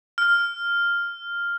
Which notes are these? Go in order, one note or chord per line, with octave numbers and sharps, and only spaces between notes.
F6